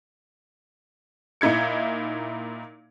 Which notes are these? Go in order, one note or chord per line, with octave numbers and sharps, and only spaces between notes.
A#2 D#4 E4 G#6 C#7